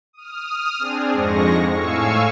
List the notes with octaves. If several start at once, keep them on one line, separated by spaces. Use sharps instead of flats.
D#6 F6
C4 D4 G#4
F2 G#2 G#3 C#6 A#6
A2 F5 G#5 C#6 E6